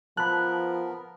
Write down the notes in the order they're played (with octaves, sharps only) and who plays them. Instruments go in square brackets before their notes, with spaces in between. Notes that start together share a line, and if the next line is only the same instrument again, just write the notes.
[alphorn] F3 [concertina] B3 A#4 [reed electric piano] A5 B5 [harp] F#6